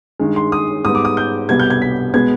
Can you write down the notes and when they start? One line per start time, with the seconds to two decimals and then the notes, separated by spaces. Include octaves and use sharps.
0.20 G2 D#3 G#3
0.36 C6
0.52 D#6
0.85 G#2 G3 B3 D#6
0.95 D6
1.05 D#6
1.17 G6
1.49 C2 B2 G3 B3 G#6
1.59 G6
1.70 G#6
1.82 B6
2.14 B2 G#3 B3 G#6